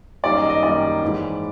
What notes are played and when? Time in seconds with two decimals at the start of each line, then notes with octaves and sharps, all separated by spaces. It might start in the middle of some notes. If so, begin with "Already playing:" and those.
0.23 F#2 D#3 G3 A#3 D5
0.37 D#5
0.49 D#5
0.62 F#2 D#3 G3 A#3 D5
1.02 G#2 E3 G#3